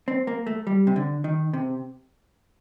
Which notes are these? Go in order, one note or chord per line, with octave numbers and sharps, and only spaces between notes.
C4
A#3
A3
G3
C3
D3
D#3
C3